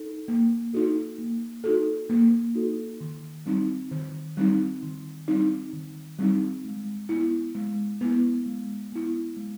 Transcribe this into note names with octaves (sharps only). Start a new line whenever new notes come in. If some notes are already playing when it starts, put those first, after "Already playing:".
Already playing: D#4 A4
A#3
D#4 F#4 A4
A#3
D#4 F#4 A4
A#3
D#4 F#4 A4
D#3
G3 C4 D#4
D#3
G3 C4 D#4
D#3
G3 C4 D#4
D#3
G3 C4 D#4
G#3
B3 E4
G#3
B3 E4
G#3
B3 E4
G#3